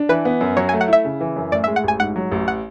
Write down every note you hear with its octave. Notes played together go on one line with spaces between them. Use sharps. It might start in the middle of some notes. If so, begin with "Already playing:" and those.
Already playing: D4
E3 B4
B3
F#2
F#3 C#5
A3 G#5
F#5
E4 E5
C#3
E3
F#2
A2 D5
G#3 E5
F#5
A1 G#5
G#2 F#5
F#3
A1
F#5